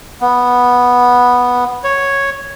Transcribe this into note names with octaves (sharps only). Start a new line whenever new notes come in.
B3
C#5